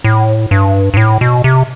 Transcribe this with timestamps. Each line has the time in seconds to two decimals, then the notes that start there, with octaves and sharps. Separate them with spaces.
0.04 A2
0.51 G2
0.94 G2
0.97 A2
1.21 B2
1.44 C3